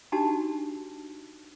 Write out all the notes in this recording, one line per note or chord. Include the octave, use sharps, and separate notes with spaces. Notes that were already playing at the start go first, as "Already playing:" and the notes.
D4 D#4 F#4 G4 A5